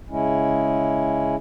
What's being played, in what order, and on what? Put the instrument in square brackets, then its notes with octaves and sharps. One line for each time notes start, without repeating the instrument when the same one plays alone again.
[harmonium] C#3 G#3 C#4 E4